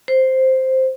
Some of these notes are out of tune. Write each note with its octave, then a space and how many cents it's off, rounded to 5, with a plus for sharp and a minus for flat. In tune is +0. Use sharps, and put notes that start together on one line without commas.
C5 +0